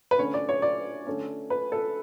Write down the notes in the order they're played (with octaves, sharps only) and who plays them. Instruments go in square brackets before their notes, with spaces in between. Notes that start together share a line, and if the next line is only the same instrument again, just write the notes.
[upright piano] B4
D3 A3 C#4 C#5
D5
C#5
D5
D3 A3 C#4
B4
A4